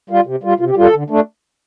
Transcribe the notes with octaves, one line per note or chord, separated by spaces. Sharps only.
G3 F4
C3
G3 F4
C3 F4
G4
G3 F4 A4
D3
A3 D4